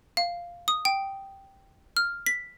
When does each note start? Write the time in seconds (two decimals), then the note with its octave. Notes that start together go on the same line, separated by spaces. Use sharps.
0.17 F5
0.68 D#6
0.85 G5
1.97 F6
2.26 B6